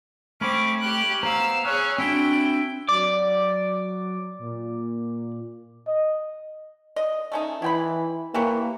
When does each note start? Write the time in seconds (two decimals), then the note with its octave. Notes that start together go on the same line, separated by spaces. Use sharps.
0.41 A3 C4 C#4 B5 D6
0.81 C#4 G4 F#6
1.23 B3 C5 F5 A#5 E6
1.65 C#4 G#4 C#5 G#5 E6 F#6
1.98 C4 D4 E4 F#4 G5
2.89 F#3 D5 D6
4.39 A#2
5.87 D#5
6.96 D#5
7.32 A3 C#4 D#4
7.62 E3 E4 G5 B5
8.34 E3 A#3 G4 C#5